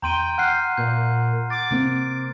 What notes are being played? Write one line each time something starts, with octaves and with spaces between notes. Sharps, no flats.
E2 G5 A#5 C6 D#7
F#5 F6 F#6 C7
A#2 G6
D6 A6
C3 A#3 C4